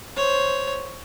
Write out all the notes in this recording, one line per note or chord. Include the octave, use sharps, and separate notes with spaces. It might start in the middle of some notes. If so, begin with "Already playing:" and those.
C5 C#5